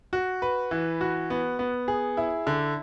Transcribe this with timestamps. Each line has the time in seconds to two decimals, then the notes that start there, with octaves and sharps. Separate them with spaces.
0.13 F#4
0.42 B4
0.71 E3
1.01 F#4
1.30 B3
1.59 B3
1.88 G#4
2.17 E4
2.47 D3